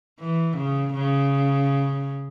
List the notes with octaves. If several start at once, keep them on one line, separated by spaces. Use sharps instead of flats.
E3
C#3
C#3